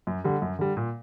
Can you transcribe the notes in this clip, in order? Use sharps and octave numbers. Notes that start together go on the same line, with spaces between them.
F#2
D3 G3
F#2
D3 G3
A#2